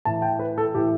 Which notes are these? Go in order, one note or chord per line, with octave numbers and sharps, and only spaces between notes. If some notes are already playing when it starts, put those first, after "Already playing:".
A2 E3 A5
G5
B4
A4
A2 E3 G4